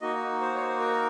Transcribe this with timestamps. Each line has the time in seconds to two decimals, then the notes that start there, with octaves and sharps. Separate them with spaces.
0.01 A#3 D#4 F#4 D#5
0.41 C5
0.55 C#5
0.61 C5
0.80 A#4